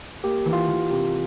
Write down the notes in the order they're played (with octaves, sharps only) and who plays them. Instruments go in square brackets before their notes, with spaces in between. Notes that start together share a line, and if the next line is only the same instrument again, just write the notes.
[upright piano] A#3 [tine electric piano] G4
[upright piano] E3
[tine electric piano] F4
[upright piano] E3
C3